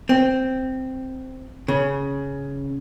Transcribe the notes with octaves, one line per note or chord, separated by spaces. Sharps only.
C4
C#3